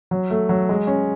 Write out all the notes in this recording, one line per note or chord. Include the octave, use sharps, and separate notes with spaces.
F#3
A3
F#3
G#3
C#4